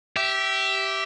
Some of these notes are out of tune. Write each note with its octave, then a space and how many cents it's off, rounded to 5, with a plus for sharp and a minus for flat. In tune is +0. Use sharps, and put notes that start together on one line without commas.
G4 -15 E5 +0